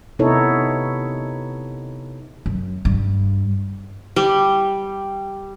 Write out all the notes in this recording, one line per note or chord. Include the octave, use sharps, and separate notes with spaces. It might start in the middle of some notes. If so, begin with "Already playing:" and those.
C3 B3 D#4 E4 A4 C#5
F#2
G2
G3